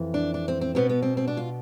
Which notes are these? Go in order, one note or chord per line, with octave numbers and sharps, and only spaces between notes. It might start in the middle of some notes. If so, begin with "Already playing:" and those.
Already playing: F2 E3
D4
D4
C4
C4
B2 B3 C4
B3
C4
C4
D4
F4